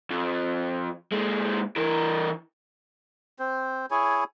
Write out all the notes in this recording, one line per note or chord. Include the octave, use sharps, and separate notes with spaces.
F2
A#2 G#3
E3 A#4
C4 C5
E4 G#4 C#5 G#5